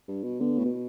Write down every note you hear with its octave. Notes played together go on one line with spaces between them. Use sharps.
G2
B2
D3 B3
A2
B2